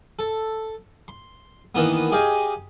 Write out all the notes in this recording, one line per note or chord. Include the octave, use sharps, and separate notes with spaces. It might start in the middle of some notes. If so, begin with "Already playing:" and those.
A4
C6
D#3 E3 A#3 B3
G4 G#4 D#5 F5 G5 G#5